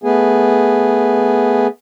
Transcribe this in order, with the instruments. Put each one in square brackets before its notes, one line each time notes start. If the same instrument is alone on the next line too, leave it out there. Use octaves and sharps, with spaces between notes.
[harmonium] A3 B3 G#4